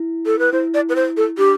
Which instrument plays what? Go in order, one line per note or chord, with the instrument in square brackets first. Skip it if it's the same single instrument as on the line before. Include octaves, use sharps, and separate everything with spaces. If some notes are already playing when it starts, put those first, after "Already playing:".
Already playing: [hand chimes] E4
[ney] A4
B4
[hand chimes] E4 [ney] C5
[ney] D5
B4
C5
A4
[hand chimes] D4 [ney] G4